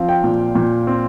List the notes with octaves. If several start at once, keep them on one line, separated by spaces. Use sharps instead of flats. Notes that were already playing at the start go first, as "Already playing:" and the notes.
Already playing: F3 C4 F5
G5
A#2
A#2
C4